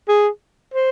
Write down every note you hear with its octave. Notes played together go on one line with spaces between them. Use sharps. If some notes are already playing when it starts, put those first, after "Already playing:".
G#4
C5